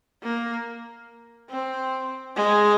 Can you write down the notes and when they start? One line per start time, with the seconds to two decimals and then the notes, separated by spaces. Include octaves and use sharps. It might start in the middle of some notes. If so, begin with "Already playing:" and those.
0.23 A#3
1.50 C4
2.36 G#3